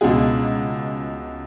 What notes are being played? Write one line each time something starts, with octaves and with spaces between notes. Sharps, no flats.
C#2 B2 G#3 G#4